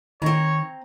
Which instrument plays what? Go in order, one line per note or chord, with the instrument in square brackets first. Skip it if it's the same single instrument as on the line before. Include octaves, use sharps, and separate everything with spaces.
[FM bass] D#3 [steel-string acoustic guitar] C4 A#5 [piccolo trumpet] C#5